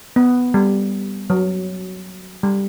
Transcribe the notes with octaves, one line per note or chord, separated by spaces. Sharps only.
B3
G3
F#3
G3